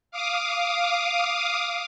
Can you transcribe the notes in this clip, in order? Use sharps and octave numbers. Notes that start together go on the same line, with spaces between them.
F5 D6 D#6